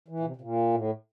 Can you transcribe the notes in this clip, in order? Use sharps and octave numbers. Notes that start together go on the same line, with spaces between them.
E3
A#2
C3
C3
A#2
A2